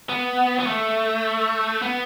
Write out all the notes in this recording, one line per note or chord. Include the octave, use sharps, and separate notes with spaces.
B3
B3
A3
B3